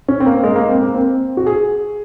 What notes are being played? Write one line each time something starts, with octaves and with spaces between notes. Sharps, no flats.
C#4
C4
A#3
G#3
A#3
C4
A#3
C4
F#4
G#4